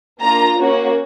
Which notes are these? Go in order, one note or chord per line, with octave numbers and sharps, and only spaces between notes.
A#3 D4 F4 A#5
A#3 C#4 F#4